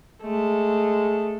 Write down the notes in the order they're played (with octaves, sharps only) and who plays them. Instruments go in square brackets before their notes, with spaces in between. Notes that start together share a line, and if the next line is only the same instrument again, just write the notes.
[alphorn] G#3 [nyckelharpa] A3